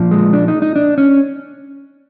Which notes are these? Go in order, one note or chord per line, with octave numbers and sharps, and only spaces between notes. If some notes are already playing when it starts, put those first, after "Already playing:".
Already playing: A#2 F3
G#3
D4
D#4
D#4
D4
C#4